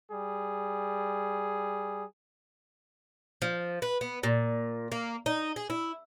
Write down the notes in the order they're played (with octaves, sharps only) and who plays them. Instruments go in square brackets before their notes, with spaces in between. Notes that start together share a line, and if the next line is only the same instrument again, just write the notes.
[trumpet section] G3 G#4
[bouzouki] F3
B4
B3
A#2
A#3
D#4
G#4
E4